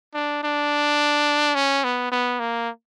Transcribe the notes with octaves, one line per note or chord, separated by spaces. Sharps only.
D4
D4
C#4
B3
B3
A#3